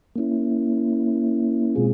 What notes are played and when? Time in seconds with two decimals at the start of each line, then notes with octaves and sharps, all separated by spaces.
0.15 A#3 C#4 E4
1.75 B2 G#3 C4 F4 G#4